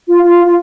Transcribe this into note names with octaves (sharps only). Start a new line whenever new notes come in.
F4
F4
F4